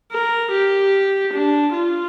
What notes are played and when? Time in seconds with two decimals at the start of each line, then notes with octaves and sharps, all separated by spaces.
0.12 A#4
0.52 G4
1.33 D4
1.74 F4